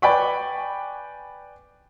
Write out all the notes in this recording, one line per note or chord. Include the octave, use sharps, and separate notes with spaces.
B4 D5 G5 G#5 B5 C#6